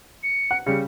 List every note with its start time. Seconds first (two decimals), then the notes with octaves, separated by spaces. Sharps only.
0.23 C#7
0.51 F#5
0.66 C#3 G3 C#7